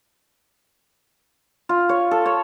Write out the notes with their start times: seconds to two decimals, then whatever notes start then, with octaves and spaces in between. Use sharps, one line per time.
1.69 F4
1.89 C#5
2.11 A4
2.26 C#5